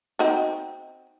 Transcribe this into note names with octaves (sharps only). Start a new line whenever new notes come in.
C4 D#4 F#4